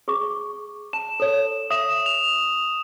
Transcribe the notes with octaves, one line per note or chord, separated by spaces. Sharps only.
G#4 C#6 D6
A5 E7
A4 C#5
E5 D#6 E7
F7